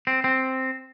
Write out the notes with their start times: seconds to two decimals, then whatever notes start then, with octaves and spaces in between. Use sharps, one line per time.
0.07 C4
0.24 C4